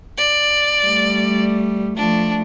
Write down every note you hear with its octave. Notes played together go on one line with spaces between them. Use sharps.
D5
G3 A3
F3 A3 D4